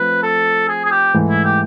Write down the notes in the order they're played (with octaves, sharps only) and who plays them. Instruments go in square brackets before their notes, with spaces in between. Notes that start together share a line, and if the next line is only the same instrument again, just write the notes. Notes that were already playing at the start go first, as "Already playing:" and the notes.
Already playing: [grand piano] F3 A3 C4 [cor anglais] B4
[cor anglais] A4
G#4
G#4
G4
[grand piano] G#2 E3 A3
[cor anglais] E4
G4